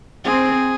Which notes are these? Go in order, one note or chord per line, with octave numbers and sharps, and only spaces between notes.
C4 G#4